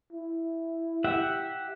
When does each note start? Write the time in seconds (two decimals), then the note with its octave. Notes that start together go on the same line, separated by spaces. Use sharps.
0.13 E4
1.04 G4 E5 F#5